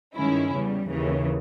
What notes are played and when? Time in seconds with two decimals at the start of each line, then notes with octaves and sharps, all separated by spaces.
0.15 G2 D#3 G#3 C#4 E4
0.52 E2 C#3 G3
0.89 D#2 C#3 E3